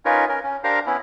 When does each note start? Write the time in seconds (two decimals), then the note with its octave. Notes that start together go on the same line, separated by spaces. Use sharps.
0.05 C#4 D#4 F4 A#4 B4 C#5
0.29 C#4 A#4
0.44 C#4
0.64 D4 G4 A#4 C5 F5 A#5
0.86 B3 C#4 E4